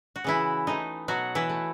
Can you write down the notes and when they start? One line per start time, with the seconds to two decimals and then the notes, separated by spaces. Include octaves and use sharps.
0.16 F#4
0.24 C#3 E3 E4
0.67 E3 A3 D#4
1.08 B2 F#3 F#4
1.35 E3 E4
1.49 A3